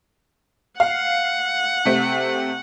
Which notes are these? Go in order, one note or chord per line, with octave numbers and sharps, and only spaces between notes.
F5 F#5
C3 A3 C4